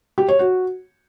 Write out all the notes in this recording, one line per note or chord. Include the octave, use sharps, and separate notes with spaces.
G4
C#5
F#4